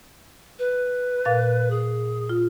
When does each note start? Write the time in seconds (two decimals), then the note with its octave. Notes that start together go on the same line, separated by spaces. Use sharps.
0.59 B4
1.25 A#2 F5 A6
1.70 G#4
2.29 F4